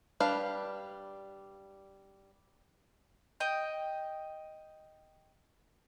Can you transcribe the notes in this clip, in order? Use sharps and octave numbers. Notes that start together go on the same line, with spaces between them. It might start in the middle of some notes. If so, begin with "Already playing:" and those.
G3 D4 B4 F5
D#5 G5